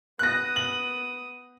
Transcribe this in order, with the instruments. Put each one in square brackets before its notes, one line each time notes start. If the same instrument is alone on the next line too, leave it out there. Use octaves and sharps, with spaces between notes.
[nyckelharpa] B3 D#6 [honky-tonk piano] F#6 A#6
[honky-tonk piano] F#7